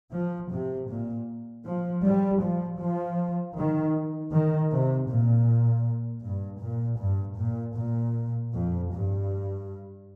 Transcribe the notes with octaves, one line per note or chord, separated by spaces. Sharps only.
F3
C3
A#2
F3
G3
F3
F3
D#3
D#3
C3
A#2
G2
A#2
G2
A#2
A#2
F2
G2